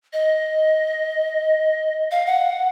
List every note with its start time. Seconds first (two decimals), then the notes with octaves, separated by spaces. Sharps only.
0.13 D#5
2.11 F5
2.26 F#5